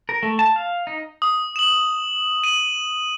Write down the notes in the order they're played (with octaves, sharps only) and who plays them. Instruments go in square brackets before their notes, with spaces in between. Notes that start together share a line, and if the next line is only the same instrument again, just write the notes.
[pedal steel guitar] A#4
A3
A5
F5
D#4
[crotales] D#6
E7 F#7
D#7 F#7